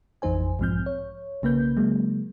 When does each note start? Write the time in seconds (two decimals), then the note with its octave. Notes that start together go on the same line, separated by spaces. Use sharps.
0.22 A1 F2 E3 D#4 C5 G#5
0.59 B1 G#2 F3 C4 F6 G6
0.86 C#5
1.42 B1 C#3 A#3 B4 G6
1.77 C#3 F#3 G#3 A#3